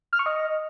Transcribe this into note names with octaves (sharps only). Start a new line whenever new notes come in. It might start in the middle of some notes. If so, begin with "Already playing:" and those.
F6
C#6
D#5